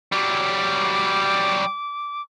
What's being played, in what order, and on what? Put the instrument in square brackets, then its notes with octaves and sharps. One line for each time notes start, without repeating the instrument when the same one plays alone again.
[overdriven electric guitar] F#3 G3 [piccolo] D6